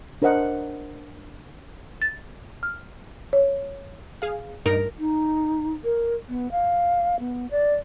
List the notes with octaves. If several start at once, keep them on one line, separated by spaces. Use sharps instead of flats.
D4 A#4 C5 D#5 F#5
A6
F6
C#5
G#4 F5
G2 D#4 A#4 D7
D#4
A#4
B3
F5
B3
D5